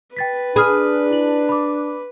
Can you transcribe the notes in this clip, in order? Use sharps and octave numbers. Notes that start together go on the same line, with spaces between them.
B4 G5 A6 B6
D4 G#4 B5 D#6 F6
E4 F#7
B5 D6